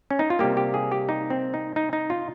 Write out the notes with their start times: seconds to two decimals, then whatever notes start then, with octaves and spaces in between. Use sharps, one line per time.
0.10 C#4
0.19 D#4
0.30 F4
0.39 C3 G3 A#3 G4
0.57 G4
0.74 G#4
0.92 G4
1.09 D#4
1.30 C4
1.54 D#4
1.76 D#4
1.93 D#4
2.10 F4